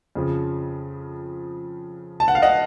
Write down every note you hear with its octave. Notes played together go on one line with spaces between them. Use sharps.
F2 C#3 F3
A5
F#5
F5
D#5 F#5